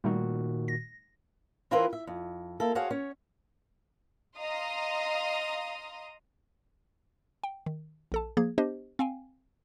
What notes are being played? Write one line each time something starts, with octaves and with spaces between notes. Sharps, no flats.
A#2 D#3 G3 A3 D#4 F#4
A#6
E3 C4 E4 F4 A#4 B4
E5
F2
A#3 E4 A4
F#4 G#4 C5 C#5 F5
C#4 C#5
D#5 F5 A#5 C6 D#6
G5
D#3
A#1 A4 A5
F3 A#3 G#4 G#6
B3 D4 G4 C5 D#5
C4 F5 G5 G#5